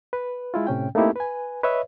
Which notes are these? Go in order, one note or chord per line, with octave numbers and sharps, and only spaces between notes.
B4
G#3 E4 F4
A2 C3 C#4 G5
A3 A#3 C4 D#4 E4 G4
B4 G#5
B4 C#5 D#5 E5